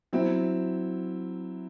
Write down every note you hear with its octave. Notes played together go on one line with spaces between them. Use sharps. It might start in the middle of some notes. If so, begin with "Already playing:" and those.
F#3 C4 E4